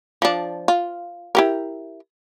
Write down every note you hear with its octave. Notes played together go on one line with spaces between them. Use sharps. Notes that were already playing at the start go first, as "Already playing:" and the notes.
F3 D4
F4
E4 G4 A#4